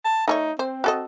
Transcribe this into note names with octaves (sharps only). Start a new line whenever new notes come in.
A5
A3 D#4 A4 C#5
C4 C5
F#4 A4 D#5